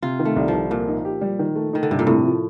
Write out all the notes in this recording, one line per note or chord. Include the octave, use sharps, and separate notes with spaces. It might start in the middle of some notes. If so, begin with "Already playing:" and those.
C3 F4
D#3
A3
C2
F3
C2
A#2 A#3
D#4
G4
G3
D#3
A3
D#3 D#4
D3
G2 C3
A#2
A2 C3
F3